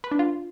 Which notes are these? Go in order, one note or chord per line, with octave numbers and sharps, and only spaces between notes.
B4
D4
F4